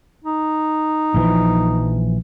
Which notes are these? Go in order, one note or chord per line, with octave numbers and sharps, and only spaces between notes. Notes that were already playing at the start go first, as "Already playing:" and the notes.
D#4
A#1 E3 F3